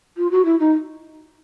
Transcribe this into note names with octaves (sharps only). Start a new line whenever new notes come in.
F4
F#4
E4
D#4